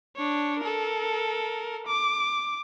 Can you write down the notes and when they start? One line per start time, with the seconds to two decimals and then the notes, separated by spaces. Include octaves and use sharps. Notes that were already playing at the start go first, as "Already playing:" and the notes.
0.16 D4 C#5
0.60 A4 A#4
1.87 D6